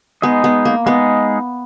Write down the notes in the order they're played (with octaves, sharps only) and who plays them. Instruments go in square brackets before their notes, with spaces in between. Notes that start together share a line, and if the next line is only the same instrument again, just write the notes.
[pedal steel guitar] G#3 D#4 G#4 D#5 [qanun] B3
[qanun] B3
A#3
[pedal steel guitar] G#3 D#4 G#4 D#5 [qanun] B3